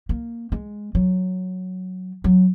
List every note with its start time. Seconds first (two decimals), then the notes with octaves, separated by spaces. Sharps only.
0.09 A#3
0.52 G#3
0.95 F#3
2.24 F#3